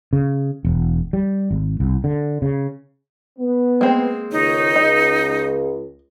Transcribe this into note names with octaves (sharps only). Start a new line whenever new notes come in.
C#3
E1
G3
G#1
C2
D3
C#3
B3
G#3 A#3 C4
C#2 D#3 D#4 C#5
C#2 D#5